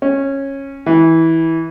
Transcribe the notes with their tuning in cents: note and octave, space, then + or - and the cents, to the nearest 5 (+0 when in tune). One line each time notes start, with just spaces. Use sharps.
C#4 -15
E3 -20